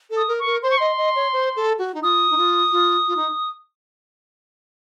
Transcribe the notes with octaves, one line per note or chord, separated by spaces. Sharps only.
A4
D#6
A#4
C#6
A#4
C5 C6
C#6
D#5 C6
D#5
C#5
C5
A4
F#4
D#4
F4 D#6
D#4
F4
F4
F4
D#4